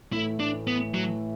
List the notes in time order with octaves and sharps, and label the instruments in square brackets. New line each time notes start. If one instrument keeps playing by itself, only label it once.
[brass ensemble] A2 E3 A3 [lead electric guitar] E4
[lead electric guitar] D4
B3
F#3